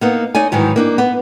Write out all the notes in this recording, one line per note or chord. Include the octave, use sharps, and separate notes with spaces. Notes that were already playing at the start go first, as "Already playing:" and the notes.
A#3 B3 D#4
D#4 C#5 D5 G#5
G#2 D#3 E3 F#3
A#3 D4 D#4
B3